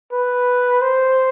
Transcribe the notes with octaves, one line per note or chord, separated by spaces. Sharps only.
B4
C5